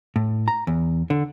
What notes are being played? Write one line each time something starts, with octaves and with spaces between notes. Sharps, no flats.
A2
A#5
E2
D3